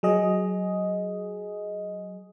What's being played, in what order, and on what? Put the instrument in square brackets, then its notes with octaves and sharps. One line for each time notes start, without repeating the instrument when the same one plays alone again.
[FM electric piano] F#3 G#4 D#5